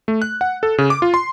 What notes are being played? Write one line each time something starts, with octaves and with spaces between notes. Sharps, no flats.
A3
F#6
F#5
A4
C#3
D6
F4
C6